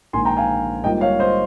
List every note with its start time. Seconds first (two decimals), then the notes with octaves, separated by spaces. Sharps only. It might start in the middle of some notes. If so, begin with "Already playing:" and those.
0.13 A#1 G#2 D#3 A#3 G#5 C6
0.25 G5 A#5
0.36 F5 G#5
0.84 G#2 G3 A#3 F4 D#5 G5
1.01 C#5 F5
1.19 C5 D#5